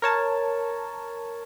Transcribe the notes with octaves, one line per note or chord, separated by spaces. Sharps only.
A#4 C#5 A5